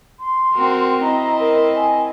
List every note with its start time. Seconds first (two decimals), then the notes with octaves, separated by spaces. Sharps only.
0.20 C6
0.54 C4 F#4 A#4
1.02 C4 E4 D#5 A#5
1.40 A#4
1.75 G#5